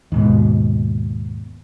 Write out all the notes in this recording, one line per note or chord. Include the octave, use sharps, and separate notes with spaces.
D#2 G#2 B2